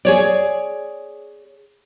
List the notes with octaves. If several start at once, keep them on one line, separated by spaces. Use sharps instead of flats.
G#4 C#5 D5